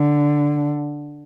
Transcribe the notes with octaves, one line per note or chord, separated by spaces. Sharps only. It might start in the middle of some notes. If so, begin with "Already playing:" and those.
Already playing: D3